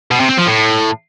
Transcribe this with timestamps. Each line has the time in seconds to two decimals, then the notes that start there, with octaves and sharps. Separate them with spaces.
0.11 B2
0.20 C3
0.29 C4
0.38 F3
0.47 A2